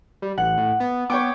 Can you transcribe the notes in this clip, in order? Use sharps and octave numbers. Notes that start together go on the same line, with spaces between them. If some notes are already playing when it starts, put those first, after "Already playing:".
G3
A1 F#5
A2
B3
B3 C#5 G5 D6